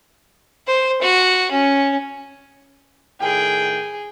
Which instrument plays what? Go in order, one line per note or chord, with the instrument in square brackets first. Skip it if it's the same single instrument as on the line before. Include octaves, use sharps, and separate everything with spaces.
[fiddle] C5
F#4
C#4
[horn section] A2 D#3 G5 [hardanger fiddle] G#4